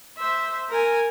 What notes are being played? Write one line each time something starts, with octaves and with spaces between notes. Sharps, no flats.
C5 E5
A#4 G#5